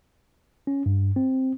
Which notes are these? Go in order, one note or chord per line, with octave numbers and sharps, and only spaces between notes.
C#4
G2
C4